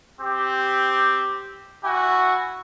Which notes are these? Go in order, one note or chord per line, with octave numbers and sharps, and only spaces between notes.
C4 G4
E4 F#4 G#5